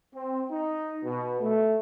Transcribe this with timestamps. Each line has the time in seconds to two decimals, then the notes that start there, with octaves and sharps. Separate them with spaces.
0.15 C4
0.51 D#4
1.04 B2
1.40 A3